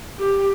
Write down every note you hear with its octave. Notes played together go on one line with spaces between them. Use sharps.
G4